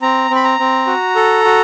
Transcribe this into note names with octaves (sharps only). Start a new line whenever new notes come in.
C4 A#5
C4 B5
A#5
C4
F#4
A4
F#4